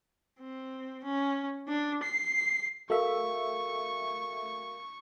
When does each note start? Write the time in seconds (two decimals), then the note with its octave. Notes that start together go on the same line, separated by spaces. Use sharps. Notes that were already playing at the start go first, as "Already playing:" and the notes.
0.40 C4
1.04 C#4
1.68 D4
2.03 C7
2.90 A3 F#4 A#4 E5 F5 C#6